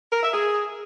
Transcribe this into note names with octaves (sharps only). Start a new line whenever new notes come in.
A#4
E5
G#4